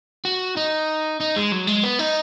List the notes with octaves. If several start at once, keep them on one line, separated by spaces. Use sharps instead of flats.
F#4
D#4
D#4
G#3
F#3
G#3
B3
D#4